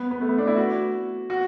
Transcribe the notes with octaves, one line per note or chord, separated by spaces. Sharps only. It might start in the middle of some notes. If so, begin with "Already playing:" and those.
Already playing: B3
B3
A3
B3
D4
E4
F#4
F#4